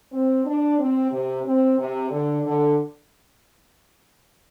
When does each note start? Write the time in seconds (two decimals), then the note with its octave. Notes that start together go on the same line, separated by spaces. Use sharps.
0.12 C4
0.44 D4
0.78 C4
1.11 C3
1.44 C4
1.77 C3
2.10 D3
2.43 D3